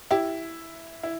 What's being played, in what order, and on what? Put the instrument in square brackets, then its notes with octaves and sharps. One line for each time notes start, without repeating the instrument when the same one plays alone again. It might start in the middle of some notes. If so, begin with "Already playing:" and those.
[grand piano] E4 [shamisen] G4
[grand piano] E4